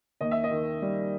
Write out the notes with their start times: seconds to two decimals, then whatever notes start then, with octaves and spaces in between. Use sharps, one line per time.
0.21 D#2 D#5
0.31 E5
0.44 D#5
0.51 D#3
0.82 G3